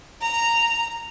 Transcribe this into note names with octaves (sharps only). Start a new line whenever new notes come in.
A#5